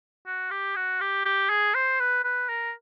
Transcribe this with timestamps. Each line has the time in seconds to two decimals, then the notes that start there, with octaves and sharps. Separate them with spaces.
0.27 F#4
0.51 G4
0.76 F#4
1.01 G4
1.26 G4
1.50 G#4
1.74 C5
2.00 B4
2.24 B4
2.49 A#4